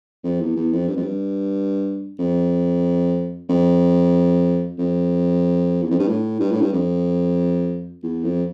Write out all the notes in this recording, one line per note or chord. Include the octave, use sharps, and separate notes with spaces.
F2
E2
E2
F2
G2
F2
G2
F2
F2
F2
E2
F2
G2
A2
G2
A2
G2
F2
E2
F2